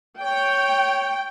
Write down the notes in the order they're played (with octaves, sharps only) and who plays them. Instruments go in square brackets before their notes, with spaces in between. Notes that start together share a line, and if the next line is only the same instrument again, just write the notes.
[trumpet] C#5 [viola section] G5